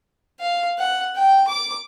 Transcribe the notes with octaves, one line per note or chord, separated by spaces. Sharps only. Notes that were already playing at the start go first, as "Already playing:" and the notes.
F5
F#5
G5
D6